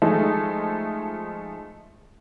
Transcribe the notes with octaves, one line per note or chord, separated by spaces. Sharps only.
F3 G#3 A3 D#4